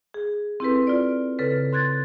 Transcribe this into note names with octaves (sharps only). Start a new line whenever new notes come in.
G#4
C4 E4 G4 A4 B4
F4 D5
C#3 A4 B4
C6 F#6 G#6 A6